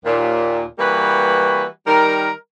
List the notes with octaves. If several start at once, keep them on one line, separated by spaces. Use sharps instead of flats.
D#2 A#2
E3 G3 A#3 F#4 B4
D#3 G3 A#4